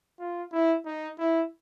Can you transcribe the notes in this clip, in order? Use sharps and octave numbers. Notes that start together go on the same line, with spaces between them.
F4
E4
D#4
E4